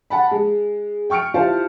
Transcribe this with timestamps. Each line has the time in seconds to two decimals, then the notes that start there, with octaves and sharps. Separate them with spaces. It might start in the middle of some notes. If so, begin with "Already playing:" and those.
0.10 F#5 A5 B5
0.31 G#3
1.10 G5 C#6 F6 C#7 D7
1.34 E4 F4 G4 C5 F5 A5